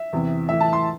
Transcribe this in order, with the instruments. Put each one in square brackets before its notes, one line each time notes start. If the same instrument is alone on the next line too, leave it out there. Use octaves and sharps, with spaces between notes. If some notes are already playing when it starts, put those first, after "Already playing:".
Already playing: [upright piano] E5
E2 C3 E3
A2 E3 E5
A5
C6